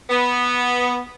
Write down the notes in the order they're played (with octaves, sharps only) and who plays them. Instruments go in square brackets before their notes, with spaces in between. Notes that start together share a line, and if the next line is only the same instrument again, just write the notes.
[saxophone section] B3